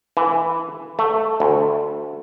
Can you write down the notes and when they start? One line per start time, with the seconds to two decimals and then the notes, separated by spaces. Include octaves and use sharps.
0.17 E3
0.99 A3
1.40 D2